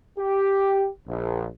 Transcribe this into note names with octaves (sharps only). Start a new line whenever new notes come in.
G4
A#1